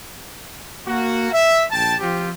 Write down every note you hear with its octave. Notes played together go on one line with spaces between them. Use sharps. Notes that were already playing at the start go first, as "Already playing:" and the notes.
A#3 F#4
E5
A#1 G5 A5
F3 C4 F4 G4